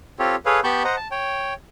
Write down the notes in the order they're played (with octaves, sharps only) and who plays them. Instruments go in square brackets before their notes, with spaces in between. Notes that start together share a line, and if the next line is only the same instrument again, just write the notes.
[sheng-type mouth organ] C4 F4 G4 A4 C#5
G#4 A4 B4 C#5 F5
B3 G4 A5 B5 C#6 G6
C5 D#5 F#5 A#5
A5
C#5 G5